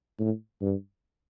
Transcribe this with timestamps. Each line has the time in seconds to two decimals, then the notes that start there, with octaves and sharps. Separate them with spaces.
0.19 A2
0.61 G2